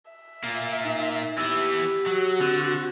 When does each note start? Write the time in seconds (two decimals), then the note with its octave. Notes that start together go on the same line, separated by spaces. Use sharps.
0.11 E5
0.44 A#2 A#3
0.85 D#4
1.38 E3 B3 G4 E6
2.06 F#3 F#4
2.41 D3 C4